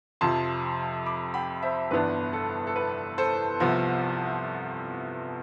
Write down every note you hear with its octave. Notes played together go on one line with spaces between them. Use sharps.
F2 C3 F3 A5 C6
B5 D6
G5 B5
C5 E5
G1 G2 E3 B3 D4 B4
A4
A4
B4
A4 C5
C2 C3 F3 B3